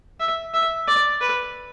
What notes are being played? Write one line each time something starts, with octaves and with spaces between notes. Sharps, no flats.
E5
E5
D5
B4